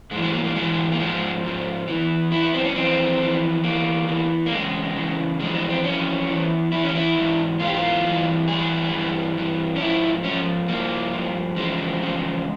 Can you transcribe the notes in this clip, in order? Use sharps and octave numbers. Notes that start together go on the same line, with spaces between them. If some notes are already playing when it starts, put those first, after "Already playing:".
G#2 G#3
E3
G#3
A#3
A#3
G#2 E3 G#3
A#3
G#2 F3 G#3
G#2 F3
E2 E3
E2 E3 E4
E4
C4
C#4
F2 E3 C4
F2 E3
E2 E3 A#3
E2 E3
A#3
E2 C#3 G#3
E2 C#3 E3
F2 E3 G#3
G#3
C4
F2 E3 C#4
E2 E3
E2 E3 E4
C#4
E4
G#2 E3
G#2 E3 F4
G4
F4
G2 E3
G2 E3 G#4
G2 E3
G2 E3
C#4
G#2 F3 E4
G#2 F3 C#4
G2 F3 A#3
G2 F3
E2 C#3 F3 G#3
E2 C#3 F3